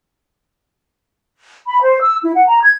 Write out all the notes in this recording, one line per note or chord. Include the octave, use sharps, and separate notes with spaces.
B5
C5
E6
E4
F#5
A#5
G#6